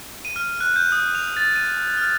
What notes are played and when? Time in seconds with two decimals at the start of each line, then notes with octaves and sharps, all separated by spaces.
0.25 D#7
0.36 F6
0.61 F#6
0.76 G6
0.92 D#6
1.15 F7
1.37 A6
1.56 D#7
1.98 F6